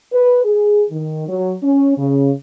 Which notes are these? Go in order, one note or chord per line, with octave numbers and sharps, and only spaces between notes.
B4
G#4
D#3
F#3
C#4
C#3